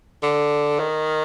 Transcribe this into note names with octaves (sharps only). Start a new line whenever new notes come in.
D3
D#3